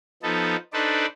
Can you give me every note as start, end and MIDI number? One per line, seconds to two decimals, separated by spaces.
0.23 0.56 53
0.23 0.56 59
0.23 0.56 63
0.23 0.56 69
0.73 1.06 62
0.73 1.06 63
0.73 1.06 69
0.73 1.06 71
0.73 1.06 72
0.73 1.06 74